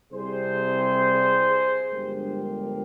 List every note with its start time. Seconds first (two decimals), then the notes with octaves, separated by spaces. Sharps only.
0.12 C2 C3 G3 G#4 C5
1.92 G1 G2 F3 G#3 G4 A#4